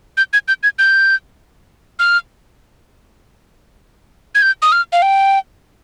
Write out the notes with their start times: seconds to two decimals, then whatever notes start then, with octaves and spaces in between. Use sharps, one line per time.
0.17 G6
0.33 G#6
0.48 G6
0.63 G#6
0.79 G6
1.99 F6
4.35 G#6
4.42 G6
4.62 D#6
4.72 F6
4.92 F5
5.02 G5